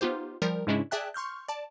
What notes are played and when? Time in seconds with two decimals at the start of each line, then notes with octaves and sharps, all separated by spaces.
0.01 B3 D#4 F4 G4 C5
0.42 F3 G3 A#4
0.67 G#2 C#3 G#3 C#4 D4 E4
0.91 G#4 D5 E5 G5 A5 F#6
1.14 C6 C#6 F6 G6
1.48 D5 A5